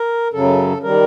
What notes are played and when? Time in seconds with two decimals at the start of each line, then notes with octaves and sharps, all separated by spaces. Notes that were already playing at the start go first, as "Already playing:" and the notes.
Already playing: A#4
0.33 F#2 C#3 F#3 A4
0.83 D#3 G3 A#4